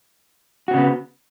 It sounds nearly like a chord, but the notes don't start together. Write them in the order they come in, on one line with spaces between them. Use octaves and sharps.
F#4 C4 C#3 B3